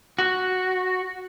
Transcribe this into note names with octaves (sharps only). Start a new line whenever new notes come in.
F#4